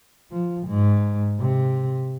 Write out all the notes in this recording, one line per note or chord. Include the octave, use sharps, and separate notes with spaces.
F3
G#2
C3